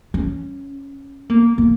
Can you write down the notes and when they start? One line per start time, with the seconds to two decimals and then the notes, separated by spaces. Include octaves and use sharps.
0.14 C#4
1.30 A#3
1.58 A#3